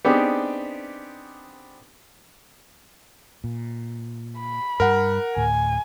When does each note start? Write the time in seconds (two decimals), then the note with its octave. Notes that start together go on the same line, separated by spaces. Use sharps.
0.05 B3 C4 D4 D#4 G4 G#4
3.44 A#2
4.40 B5
4.80 G2 G3 A#4 F#5
5.36 D2 A2 G#5